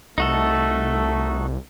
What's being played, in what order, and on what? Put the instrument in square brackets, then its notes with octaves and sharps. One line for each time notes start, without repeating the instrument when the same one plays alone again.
[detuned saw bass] C2 [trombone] A3 [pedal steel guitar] D#4 F#4 A4